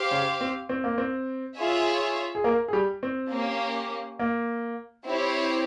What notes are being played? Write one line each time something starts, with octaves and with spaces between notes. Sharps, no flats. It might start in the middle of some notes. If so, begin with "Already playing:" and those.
Already playing: G4 C5 F5
C#3 C#4
C4
C4
A#3
C4
F4 G#4 C#5 E5
G#4
A#3 A#4
G#4
G3 G4
C4
A#3 C#4 G4
A#3
C4 E4 G4 C#5